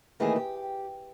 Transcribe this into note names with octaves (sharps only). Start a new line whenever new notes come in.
D#3 E3 A3 A#3 D#4 G#4
G4